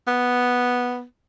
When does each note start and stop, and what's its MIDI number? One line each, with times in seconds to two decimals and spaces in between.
0.08 1.03 59